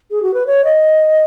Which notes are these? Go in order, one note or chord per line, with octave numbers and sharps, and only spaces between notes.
G#4
F#4
B4
C#5
D#5